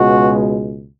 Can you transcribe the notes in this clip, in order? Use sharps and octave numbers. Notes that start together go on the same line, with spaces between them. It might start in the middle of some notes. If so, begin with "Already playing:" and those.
Already playing: C#2 B2 G#3 F#4